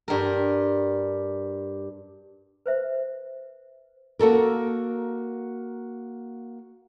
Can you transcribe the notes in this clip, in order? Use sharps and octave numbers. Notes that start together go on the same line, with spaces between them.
G2 A#4
B4 C5 E5
A#3 F#4 A4 A#4